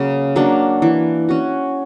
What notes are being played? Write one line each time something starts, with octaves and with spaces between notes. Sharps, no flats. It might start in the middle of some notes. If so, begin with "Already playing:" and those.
Already playing: C#3 F#3 A#3
F#3 A#3 D4
E3
C#4 F#4